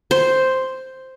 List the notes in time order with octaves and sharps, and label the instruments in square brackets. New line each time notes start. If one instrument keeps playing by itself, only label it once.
[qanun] C5